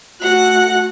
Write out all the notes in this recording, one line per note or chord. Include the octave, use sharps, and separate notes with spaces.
A3 F#4 F#5 F#6